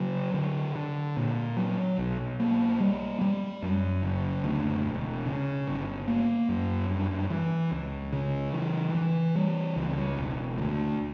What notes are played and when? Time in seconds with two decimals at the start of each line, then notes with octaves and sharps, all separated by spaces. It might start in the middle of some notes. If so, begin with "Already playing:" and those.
Already playing: C#3 F#3
0.34 D3
0.75 D3
1.17 A#2
1.57 F#3
1.98 B1
2.40 A#3
2.80 G3
3.21 G3
3.62 F#2
4.03 F#1
4.44 D2
4.85 E1
5.26 C#3
5.67 G1
6.07 A#3
6.49 F#2
6.90 G2
7.30 E3
7.71 C#2
8.12 C#3
8.53 E3
8.95 E3
9.35 G3
9.76 C#2
10.17 E1
10.58 D2